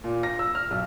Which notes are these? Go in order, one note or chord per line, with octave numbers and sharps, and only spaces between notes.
A#2
A#6
E6
F6
B1